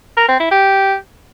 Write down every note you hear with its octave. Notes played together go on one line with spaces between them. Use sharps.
A#4
C4
E4
G4